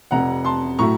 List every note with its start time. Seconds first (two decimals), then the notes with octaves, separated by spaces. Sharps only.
0.11 F1 F2 C3 F#5 A#5
0.45 A5 C6
0.78 A2 F#3 A3 A#5 C#6